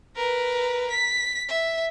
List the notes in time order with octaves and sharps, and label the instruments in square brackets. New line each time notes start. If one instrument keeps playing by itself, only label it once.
[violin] A#4 B4
B6
E5